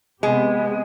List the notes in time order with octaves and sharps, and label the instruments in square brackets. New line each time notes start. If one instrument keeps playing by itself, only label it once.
[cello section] C3 B3 G4 [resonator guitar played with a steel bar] G#3